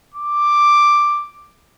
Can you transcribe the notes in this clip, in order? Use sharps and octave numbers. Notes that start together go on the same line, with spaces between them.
D6